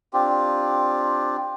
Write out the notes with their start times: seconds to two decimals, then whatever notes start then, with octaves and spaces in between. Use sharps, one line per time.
0.13 C4 D4 F4 G4